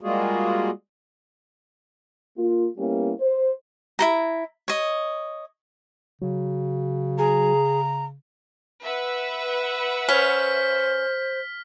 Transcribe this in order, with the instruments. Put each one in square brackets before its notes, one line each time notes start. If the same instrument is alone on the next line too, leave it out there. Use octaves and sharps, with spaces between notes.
[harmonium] G3 G#3 A#3 F4 F#4 G#4
[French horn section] A#3 F4
G3 A#3 B3 C#4 E4 G4
C5
[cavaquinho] E4 A4 A#5
C#5 D#5
[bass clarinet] C#3 [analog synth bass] F#3
[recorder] G#4 [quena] A#5
[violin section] B4 E5 F#5
[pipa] C#4 [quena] C5 [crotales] F6 B6